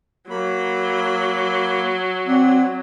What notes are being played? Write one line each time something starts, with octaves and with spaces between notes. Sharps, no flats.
F#3 A#3 B5
C4 D5 F#5